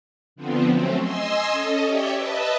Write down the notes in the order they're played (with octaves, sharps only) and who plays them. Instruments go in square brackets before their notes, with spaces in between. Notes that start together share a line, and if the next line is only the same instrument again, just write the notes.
[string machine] D3 F3 B3 C4
F#3 A3 C4 C#4
D#5 G#5 C6 E6
C#4 A4 D#5
G4 C#5 D5 E5 G5
B4 D#5 E5 A5